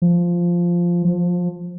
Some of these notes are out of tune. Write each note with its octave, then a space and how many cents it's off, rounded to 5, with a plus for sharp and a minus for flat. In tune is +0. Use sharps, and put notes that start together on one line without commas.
F3 -5
F3 +20